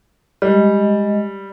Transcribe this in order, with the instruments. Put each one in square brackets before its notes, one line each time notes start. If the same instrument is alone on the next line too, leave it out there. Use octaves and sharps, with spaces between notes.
[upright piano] G3 [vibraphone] G#3 D#5